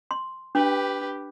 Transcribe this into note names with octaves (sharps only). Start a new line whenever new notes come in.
C6
D4 G4 B4